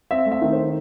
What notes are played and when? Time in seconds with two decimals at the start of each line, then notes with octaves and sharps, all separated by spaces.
0.11 C4 E5
0.26 A3
0.32 E5
0.42 D#3
0.52 C5